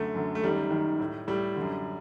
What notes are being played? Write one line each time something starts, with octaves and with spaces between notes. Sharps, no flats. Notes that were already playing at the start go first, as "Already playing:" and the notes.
Already playing: F#2 D3 A3
F#2 D3
A3
F#2 D#3 G3
F#2 D#3
A2
A2 G3
D3
F#2